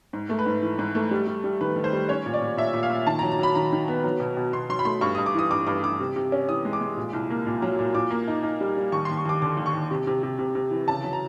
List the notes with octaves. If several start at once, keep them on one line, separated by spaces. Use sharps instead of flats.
G#2
A3
B4
G#2
E3
G#2
A3
G3
G3
G3
D#3 B4
D#3
C5
G3
C#4 C#5
A#2
D5
A#2
A#2 E5
A#2
F5
A#2
D#3 A5
A#5
F#3
A#5
F#3 B5
D#3 A#5
D#3
B3
F#3
B2
B2
B2 C6
F#3 C6
B5
A3 C6
G2 C#6
G2 D#6
D6
E3 D#6
G2 D6
G2 D6
G2 D6
C3
C3
C#4
E3 D#6
G#3
D6
G#3
A#2
C2
A#3
A#2
F#3
A#2
A#2 D6
A#3
D#4
D#4
G3
G3
D#2 C#6
D#2 C6
C#6
D#2 D6
D3 D6
D#2
C#6
D#2
C3
C3
C3
C3
C3
E3
C#3 A5
F#3
A#5